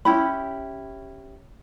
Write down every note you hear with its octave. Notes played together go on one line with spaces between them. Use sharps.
C#4 E4 G4 B5